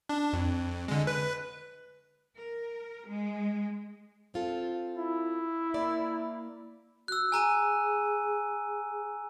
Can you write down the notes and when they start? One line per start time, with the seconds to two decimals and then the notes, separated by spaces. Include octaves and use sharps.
0.09 D4
0.33 F2
0.88 D3 G#3
1.07 B4
2.38 A#4
3.07 G#3
4.34 C4 F4 A4
4.96 E4
5.74 A#3 D5
7.08 F#4 E6 F#6
7.32 G#4 G#5 A#5 D#7